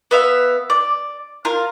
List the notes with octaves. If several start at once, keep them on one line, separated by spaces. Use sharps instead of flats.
B3 E5 F5
D5
F4 A#4